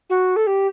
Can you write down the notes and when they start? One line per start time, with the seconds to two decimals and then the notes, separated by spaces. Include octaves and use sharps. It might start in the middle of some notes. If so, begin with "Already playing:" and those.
0.09 F#4
0.36 A4
0.46 G4